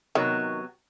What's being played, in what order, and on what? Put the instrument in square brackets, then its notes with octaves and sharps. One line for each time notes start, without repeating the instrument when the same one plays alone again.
[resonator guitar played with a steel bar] C3 F#3 B3 [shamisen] D#3